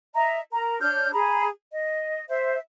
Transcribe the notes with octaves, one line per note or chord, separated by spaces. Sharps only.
D#5 E5 A#5
A#4 A#5
D4 C#5 F6 G6
G#4 A#5 B5
D#5
C5 E5